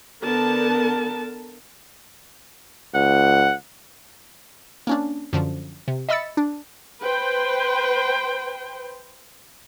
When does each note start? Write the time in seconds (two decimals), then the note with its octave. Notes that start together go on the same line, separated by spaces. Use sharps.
0.22 D3 B3 A#4 A5
2.95 C#2 F#5
4.87 A#3 C#4 D4
5.33 F#2 D3 F3
5.88 C3
6.09 D#5 E5 B5 E6 A6 C#7
6.37 D4
7.01 B4 C5 G5